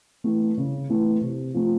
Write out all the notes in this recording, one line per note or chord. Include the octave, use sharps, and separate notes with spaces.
E3 A3
C#3
E3 A3
C3
F3 A3